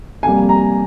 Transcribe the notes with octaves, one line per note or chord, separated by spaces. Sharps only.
F2 C3 G3 A#3 G#5
A#5